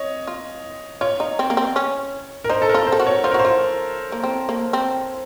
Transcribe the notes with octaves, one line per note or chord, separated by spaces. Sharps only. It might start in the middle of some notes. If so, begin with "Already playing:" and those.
Already playing: C#5 D#5
F4
F4 C#5
D#4
C4
A#3
C4
C#4
A#4
D#4 C5
A4
A#4
F4
C5
A4
F#4
C#5
F4 C5
A#4
F#4
C5
F4
A#3
C4
A#3
C4